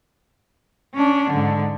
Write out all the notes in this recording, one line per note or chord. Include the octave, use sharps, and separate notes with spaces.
C#4 D4
G#2 D3